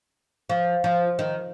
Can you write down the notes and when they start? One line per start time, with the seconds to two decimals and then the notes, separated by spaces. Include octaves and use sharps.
0.50 F3
0.84 F3
1.19 D#3